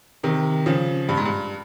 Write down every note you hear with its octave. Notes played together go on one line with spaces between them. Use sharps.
C3 D#3
C#3 F3
G2
G#2
G2